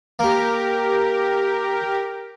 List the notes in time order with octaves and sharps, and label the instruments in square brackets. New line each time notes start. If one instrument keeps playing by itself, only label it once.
[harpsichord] A#3 [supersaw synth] G4 A#4